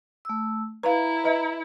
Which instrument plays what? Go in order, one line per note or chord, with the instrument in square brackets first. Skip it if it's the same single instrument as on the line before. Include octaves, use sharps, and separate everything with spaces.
[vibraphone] A3 E6
[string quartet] E4 [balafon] B4 F5 [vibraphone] A#5
[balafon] B4 D#5 E5